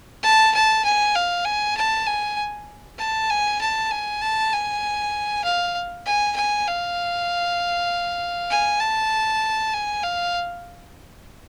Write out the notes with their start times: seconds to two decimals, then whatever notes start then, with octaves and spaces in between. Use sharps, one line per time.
0.23 A5
0.54 A5
0.84 G#5
1.15 F5
1.46 G#5
1.77 A5
2.07 G#5
2.99 A5
3.30 G#5
3.61 A5
3.91 G#5
4.22 A5
4.52 G#5
5.44 F5
6.06 G#5
6.36 G#5
6.68 F5
8.51 G#5
8.81 A5
9.74 G#5
10.04 F5